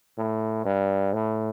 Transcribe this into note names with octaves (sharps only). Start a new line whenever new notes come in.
A2
G2
A2